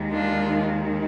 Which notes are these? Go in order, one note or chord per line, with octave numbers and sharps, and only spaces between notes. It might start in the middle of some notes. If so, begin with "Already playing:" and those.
Already playing: D#2 D#3 G#3
D4 F4